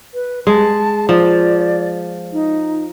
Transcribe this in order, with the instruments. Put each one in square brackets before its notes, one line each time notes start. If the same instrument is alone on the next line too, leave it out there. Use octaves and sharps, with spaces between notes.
[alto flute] B4
[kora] G#3 [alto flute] A5
[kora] F3 [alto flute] D5
[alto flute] D#4